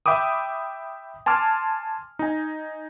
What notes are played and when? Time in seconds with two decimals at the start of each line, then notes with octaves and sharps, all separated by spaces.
0.06 E5 G5 B5 D6 D#6
1.26 G#5 A5 C6 D6 F6
2.19 D#4 G#5